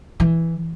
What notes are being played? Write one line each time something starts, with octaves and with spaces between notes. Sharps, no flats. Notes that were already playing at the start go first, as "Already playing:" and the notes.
E3